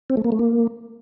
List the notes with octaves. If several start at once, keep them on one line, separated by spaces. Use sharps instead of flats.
C4
A3
A#3
A3
A#3